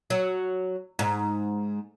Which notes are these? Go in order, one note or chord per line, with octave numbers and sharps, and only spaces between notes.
F#3
G#2